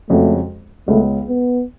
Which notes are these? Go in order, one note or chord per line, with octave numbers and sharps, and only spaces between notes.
F2 C#3 G#3 A3 C#4 F#4
C#2 C#3 G#3 A3 B3
B3